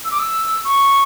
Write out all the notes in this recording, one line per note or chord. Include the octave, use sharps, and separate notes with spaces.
E6
D6
E6
C#6